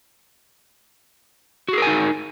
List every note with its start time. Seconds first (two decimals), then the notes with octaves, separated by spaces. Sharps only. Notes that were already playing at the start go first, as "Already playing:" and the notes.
1.69 F#4
1.73 G#4
1.78 A#4
1.82 G#5
1.87 D#4